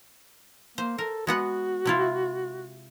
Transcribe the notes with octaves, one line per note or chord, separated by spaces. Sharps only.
A#3 C5
A4 A#4
G#3 B3 F#4 F#5
C3 E4 F4